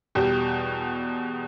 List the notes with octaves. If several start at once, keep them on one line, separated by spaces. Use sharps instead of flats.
E2 B2 G3 G4